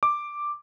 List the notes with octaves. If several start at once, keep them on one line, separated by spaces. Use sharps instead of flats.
D6